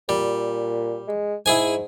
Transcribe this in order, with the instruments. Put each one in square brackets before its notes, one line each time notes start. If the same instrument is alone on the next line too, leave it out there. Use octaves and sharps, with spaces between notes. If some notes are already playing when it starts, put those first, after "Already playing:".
[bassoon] A#2 [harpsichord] G3
[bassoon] G#3
[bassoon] G#2 [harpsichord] E4 G#4 G#5